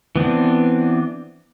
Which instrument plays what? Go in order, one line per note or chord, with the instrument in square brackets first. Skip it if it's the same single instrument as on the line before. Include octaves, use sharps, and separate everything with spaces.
[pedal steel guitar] E3 B3 C4 D4